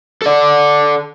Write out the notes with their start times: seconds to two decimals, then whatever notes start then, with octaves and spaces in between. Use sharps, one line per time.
0.22 A4 D5